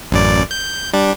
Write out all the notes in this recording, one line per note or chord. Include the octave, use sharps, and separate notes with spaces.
A1 F#2 D5
G6
G3 D4